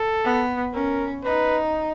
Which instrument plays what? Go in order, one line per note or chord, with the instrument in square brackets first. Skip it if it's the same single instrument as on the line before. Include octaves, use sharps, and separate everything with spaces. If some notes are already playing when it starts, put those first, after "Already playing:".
Already playing: [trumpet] A4
[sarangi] B3
[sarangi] C#4 [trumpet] A#4
[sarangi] D#4 [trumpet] B4